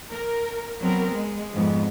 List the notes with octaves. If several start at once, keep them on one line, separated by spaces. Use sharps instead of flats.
A#4
F#3 B3 C4 A#4
G#3
F2 G#2 G#3 B3